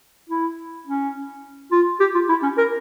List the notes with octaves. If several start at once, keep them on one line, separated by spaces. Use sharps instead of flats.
E4
C#4
F4
G4
F4
E4
C#4
A#4